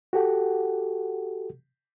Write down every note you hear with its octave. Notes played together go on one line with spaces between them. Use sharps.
F#4 G4 A4 F#5